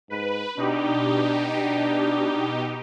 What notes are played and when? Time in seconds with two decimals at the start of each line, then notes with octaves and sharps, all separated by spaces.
0.10 G#2 B4
0.57 B2 D4 D#4 G4
1.56 D4